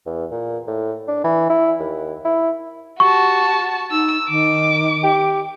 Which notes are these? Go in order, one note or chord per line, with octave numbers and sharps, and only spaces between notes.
E2
A#2
A2
D4
E3
E4
D#2
E4
F#4 G4 A5 C#6
D#4 E6
D#3 D6
G4